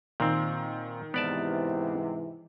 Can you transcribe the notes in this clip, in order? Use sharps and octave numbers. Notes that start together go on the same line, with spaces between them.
A#2 D#3 C4
G#2 C3 E3 B3 D5 A5